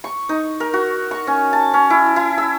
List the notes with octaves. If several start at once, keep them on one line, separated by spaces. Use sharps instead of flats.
C#6
D#4
A#4
F#4
C#6
C#4
A5
C#4
E4
E4
E6